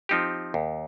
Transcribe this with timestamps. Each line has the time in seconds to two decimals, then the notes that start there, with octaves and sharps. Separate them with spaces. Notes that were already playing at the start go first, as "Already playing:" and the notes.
0.09 F3 C4 D#4 G4
0.54 D#2